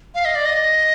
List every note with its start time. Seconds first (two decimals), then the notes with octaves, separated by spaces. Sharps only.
0.15 F5
0.25 D#5
0.35 D5
0.46 D#5